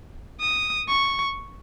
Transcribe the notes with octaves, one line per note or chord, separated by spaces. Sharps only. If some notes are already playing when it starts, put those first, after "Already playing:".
D#6
C#6